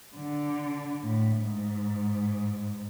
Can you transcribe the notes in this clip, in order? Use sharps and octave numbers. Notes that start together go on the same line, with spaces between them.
D3
A2
G#2